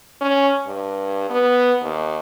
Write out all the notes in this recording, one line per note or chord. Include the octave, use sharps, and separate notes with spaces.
C#4
G2
B3
D#2